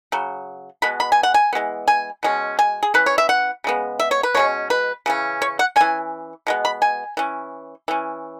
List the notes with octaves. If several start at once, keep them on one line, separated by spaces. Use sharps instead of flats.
C#3 F#3
B2 G#3 B3 B5
B5
G#5
F#5
G#5
E3 G#3 B3
G#5
B2 G#3 C#4
G#5
G#4
E3 C#4 B4
C#5
E5
F#5
C#3 G#3 B3
E5
C#5
B4
B2 G#3 C#4 C#5
B4
C#3 E3 C#4
C#5
F#5
E3 C#4 G#5
B2 G#3 B3
B5
G#5
E3 C#4
E3 C#4